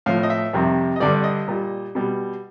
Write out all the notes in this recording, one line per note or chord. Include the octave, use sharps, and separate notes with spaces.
A2 F3 F5
D#5
E5
F2 C3 D#3 G3
D#5
G2 D3 G3 D5
D5
D#5
A#2 G3
B2 G3